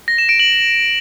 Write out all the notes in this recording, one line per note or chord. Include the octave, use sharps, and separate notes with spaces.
A#6
E7
D7
F#7